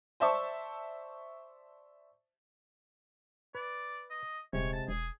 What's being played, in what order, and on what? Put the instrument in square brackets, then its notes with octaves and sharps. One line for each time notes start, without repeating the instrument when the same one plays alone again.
[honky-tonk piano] C5 D5 E5 A5 C#6
[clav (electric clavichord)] B4 [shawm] D5
[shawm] D#5
[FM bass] D#1 [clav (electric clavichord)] C3 G#3 [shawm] C#5
[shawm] A5
[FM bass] E1 [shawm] G#4